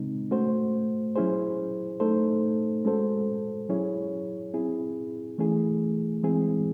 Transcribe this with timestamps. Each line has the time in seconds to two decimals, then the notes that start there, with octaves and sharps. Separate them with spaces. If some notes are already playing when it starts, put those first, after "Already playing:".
Already playing: C#3 G#3 C4 D#4
0.31 A3 C#4 F#4 C5
1.16 F#3 C#4 E4 G#4 C5
2.00 A3 D#4 A4 C5
2.85 G#3 C#4 F#4 A4 C5
3.69 F#3 C#4 E4 G#4 C#5
4.54 C4 E4 G#4
5.38 E3 A3 C#4 E4 G#4
6.23 E3 G#3 C4 E4 G#4